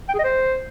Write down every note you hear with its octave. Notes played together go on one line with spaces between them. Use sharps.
G5
G#4
D#5
C5